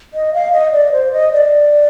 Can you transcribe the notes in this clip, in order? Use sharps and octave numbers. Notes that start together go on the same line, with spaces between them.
D#5
F5
D#5
D5
C5
D#5
D5